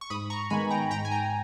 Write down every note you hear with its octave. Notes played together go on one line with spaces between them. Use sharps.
C#6
G#2 B5 D#6
A#5 C#6
D#3 G#3 B3 G#5 B5
G5 A#5
G#2 G5 A#5
G#5
G5 A#5